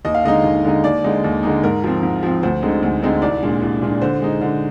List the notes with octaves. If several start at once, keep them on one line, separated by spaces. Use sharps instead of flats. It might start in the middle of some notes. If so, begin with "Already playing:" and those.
D#2 D#5
F5
D3 G#3 D#4 D#5
D#2
D3 G#3 D#4
D#2 D5
D3 G#3 D#4
D#2
D3 G#3 D#4
G#2 A#4
F3 C4
G#2
F3 C4
D2 C5
D3 G#3 C4 D#4
D2
D3 G#3 C4 D#4
C2 D5
A#2 G#3 D4
C2
A#2 G#3 D4
D3 C5
G#3 D#4
D3